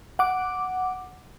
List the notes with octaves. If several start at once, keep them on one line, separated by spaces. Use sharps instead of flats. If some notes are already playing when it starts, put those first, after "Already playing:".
F#5 D6